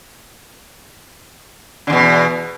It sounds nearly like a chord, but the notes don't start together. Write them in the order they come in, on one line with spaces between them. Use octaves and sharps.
D3 E2 B2